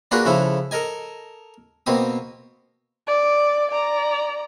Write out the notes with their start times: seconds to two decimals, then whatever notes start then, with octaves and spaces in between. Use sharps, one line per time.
0.11 A#3 D4 F4 F#4 G#4 B4
0.25 C#3 F3 E4 A4
0.71 A4 A#4 D#5 G#5
1.86 B2 A#3 C4 D#6
3.07 D5
3.71 D5 A#5